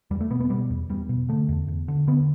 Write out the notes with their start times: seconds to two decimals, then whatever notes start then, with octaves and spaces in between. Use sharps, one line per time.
0.11 E2 G3
0.21 A3
0.30 B2 B3
0.40 B3
0.50 B2 G3
0.70 E2
0.89 E2 G3
1.09 B2
1.29 D3 A3
1.49 E2
1.68 E2
1.88 D3
2.07 D3 B3